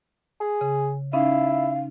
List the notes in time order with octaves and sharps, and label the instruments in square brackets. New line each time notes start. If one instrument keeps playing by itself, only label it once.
[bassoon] G#4
[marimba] C#3
[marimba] C#4 D#4 [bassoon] E4 [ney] F5